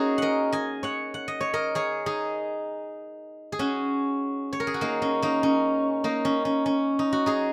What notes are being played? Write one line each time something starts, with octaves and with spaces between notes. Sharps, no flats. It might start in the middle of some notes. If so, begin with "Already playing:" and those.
Already playing: A#3 C#4 D#4 F#4 G#4
A#4 D#5 F#5
D#5 G#5
C#5 F#5
F#5
D#5
C#5
A#4 D#5
G#4 C#5
D#4 G#4
G#4
C#4 F#4
C#5
A#4
G#4
F#4
A#3 D#4
C#4
A#3 D#4
C#4
A#3 D#4
C#4
C#4
C#4
D#4
F#4
D#4 G#4